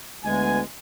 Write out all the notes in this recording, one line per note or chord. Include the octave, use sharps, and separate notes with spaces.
D2 G#3 B3 G#5